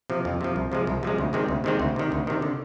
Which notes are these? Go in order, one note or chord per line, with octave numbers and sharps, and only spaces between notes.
C3 F3
F2
C3 F3
C2
C3 F3 G#3
C2
C3 F3 G#3
D2
C3 D#3 G#3 C4
D2
C3 D#3 G#3 C4
D2
C3 D#3
D2
C3 D#3
D3